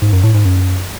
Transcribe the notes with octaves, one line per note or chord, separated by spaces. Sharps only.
G#2
F#2
A2
G#2
F#2